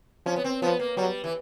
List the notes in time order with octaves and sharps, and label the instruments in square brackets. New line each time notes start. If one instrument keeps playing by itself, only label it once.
[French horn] F3 [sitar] C#4
[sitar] B3
C4
[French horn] F3 [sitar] B3
[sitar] A#3
[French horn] F#3 [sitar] G3
[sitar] E3